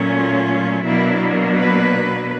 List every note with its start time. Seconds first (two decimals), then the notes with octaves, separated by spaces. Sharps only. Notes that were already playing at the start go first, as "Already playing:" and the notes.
Already playing: A#2 F#3 A3 C#4
0.13 F4
0.85 B2 F#3 A#3 D4 E4
1.59 B4